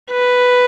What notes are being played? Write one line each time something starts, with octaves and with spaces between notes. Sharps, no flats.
B4